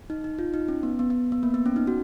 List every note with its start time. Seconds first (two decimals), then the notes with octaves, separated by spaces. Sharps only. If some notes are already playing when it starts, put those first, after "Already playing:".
0.10 D#4
0.24 D#4
0.39 F4
0.54 D#4
0.68 C#4
0.83 B3
0.99 B3
1.10 B3
1.32 B3
1.43 A#3
1.54 B3
1.66 C#4
1.76 D#4
1.87 F#4